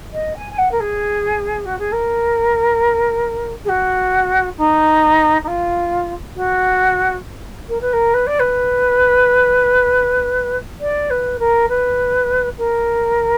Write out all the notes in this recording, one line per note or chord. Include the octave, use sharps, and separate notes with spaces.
D#5
G#5
G#5
F#5
A#4
G#4
F#4
G#4
A#4
G#4
F#4
D#4
D#4
F4
F#4
A#4
B4
A#4
B4
D5
B4
D5
B4
A#4
B4
A#4